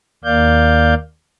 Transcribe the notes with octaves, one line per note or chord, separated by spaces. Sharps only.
D#2 A#3 D5 F5 G6